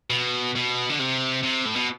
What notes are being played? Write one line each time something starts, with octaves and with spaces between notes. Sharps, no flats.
B2
B2
D3
C3
C3
A2
B2